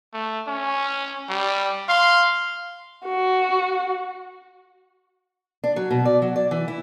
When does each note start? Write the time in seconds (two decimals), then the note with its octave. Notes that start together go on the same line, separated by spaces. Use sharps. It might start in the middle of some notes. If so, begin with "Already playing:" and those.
0.13 A3
0.47 C#4
1.29 G3
1.89 F5 C6
3.05 F#4
5.64 D4
5.76 F#3
5.91 B2
6.05 D5
6.22 F#3
6.36 D5
6.51 E3
6.68 E4